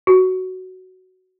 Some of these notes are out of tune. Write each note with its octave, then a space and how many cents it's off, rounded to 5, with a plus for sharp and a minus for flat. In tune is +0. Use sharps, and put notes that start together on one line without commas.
F#4 +10